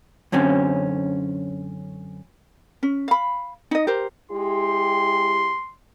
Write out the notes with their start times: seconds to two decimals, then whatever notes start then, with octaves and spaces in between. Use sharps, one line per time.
0.32 F#2 D3 C4 C#4
2.83 C#4
3.08 F5 B5
3.71 D#4 D#5
3.87 G4 A#4 C5
4.32 G#3 E4 G4 C6